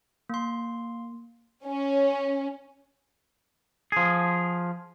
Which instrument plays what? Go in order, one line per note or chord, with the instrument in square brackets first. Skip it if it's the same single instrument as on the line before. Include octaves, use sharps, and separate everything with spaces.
[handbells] A#3 C6
[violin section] C#4
[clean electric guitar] F3 G#4